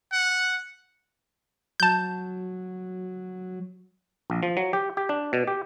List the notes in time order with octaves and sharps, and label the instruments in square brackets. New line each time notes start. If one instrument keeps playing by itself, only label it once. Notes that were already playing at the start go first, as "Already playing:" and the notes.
[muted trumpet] F#5
[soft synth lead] F#3 [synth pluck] A5 G6
[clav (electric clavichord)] A#1
F3
F#3
G4
G4
D4
B2
G4